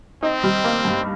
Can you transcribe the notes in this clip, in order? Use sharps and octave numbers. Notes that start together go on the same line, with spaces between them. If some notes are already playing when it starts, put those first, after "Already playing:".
C4 D#4
G3
A#3
G2